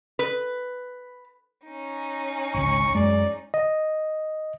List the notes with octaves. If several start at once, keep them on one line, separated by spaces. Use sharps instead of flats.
B4
C#4 D#4
G#1 C#2 C#6
F#2 G#3 D5
D#5